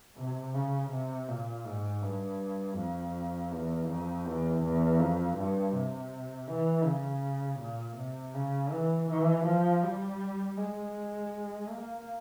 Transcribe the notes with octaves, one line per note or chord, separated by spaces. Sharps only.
C3
C#3
C3
A#2
G#2
G2
F2
E2
F2
E2
E2
F2
G2
C3
E3
C#3
A#2
C3
C#3
E3
E3
F3
G3
G#3
A#3